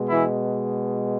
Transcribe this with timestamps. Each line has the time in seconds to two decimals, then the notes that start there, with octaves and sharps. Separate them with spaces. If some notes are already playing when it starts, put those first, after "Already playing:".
Already playing: B2 G#3
0.09 E3 E4